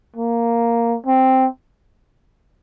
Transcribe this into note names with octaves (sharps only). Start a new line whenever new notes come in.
A#3
C4